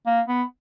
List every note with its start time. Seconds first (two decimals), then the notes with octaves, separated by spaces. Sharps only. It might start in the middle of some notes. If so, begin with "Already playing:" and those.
0.06 A#3
0.28 B3